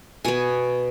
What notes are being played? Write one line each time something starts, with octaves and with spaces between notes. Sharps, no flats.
B2 B3 G#5